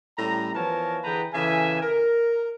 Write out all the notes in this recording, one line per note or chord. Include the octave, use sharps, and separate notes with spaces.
A2 G3 C#4 A#5
E3 F3 B3 A#4 C#5 A5
D3 E3 G#4 B4 G5 A#5
C#3 E3 A4 E5 G#5
A#4